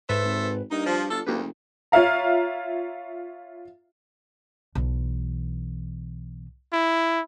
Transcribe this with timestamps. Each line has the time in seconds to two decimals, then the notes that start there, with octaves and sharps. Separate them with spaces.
0.09 G#2 A4 B4 C5 E5
0.24 G#1
0.71 G2 A#3 D#4
0.86 F3 D5
1.11 G1 F4 A4
1.26 F#1 D2 A#3 G4 B4
1.92 F4 C#5 E5 F5 A#5
4.75 B1 E3
6.73 E4